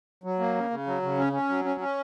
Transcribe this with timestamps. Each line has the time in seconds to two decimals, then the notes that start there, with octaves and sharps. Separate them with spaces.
0.24 F#3
0.39 A#3
0.55 C#3
0.71 C#3
0.87 F#3
1.02 C#3
1.18 C#4
1.33 C#4
1.49 F#3
1.65 C#4
1.81 C#4